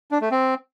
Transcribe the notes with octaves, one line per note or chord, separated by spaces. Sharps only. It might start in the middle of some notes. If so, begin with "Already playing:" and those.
D4
A3
C4